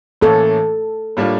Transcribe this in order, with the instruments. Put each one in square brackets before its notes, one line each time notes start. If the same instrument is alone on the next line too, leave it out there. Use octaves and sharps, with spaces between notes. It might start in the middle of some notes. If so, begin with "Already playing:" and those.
[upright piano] A2 E3 A#3 C#4 [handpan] A4
[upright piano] A2 G3 A#3 D4 F4